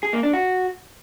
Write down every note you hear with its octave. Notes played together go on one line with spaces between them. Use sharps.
G#4
A#3
D4
F#4